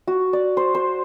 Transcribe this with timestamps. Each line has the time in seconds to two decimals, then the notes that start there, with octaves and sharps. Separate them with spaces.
0.07 F#4
0.33 D5
0.57 C5
0.75 C5